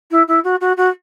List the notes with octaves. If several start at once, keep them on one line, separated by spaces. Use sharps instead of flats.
E4
E4
F#4
F#4
F#4